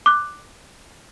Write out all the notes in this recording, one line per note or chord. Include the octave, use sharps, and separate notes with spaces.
D6 F#6